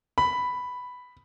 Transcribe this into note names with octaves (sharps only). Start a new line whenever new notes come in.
B5